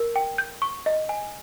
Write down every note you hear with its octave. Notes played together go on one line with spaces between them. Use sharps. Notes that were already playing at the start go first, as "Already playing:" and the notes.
Already playing: A#4
G5
G6
C#6
D#5
G#5